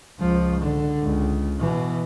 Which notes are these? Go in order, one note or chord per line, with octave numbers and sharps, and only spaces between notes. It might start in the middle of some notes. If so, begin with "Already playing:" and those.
C#2 F3
D3
C#2
B2 E3